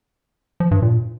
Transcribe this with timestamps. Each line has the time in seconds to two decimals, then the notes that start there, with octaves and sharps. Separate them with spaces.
0.60 F3
0.71 G2
0.82 A#2